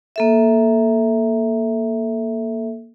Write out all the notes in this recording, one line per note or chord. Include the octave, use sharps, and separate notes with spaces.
A#3 A4 E5